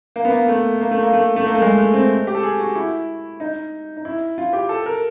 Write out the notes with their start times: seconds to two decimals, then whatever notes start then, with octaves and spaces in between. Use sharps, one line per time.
0.16 A#3
0.25 B3
0.32 A#3
0.48 A3
0.81 A#3
0.91 A3
1.03 A#3
1.13 A3
1.36 A3
1.46 A#3
1.54 A3
1.62 G#3
1.78 A3
1.94 C4
2.27 G4
2.35 A4
2.43 G#4
2.60 F#4
2.75 E4
3.40 D#4
3.97 D#4
4.05 E4
4.38 F4
4.53 G4
4.69 A4
4.86 A#4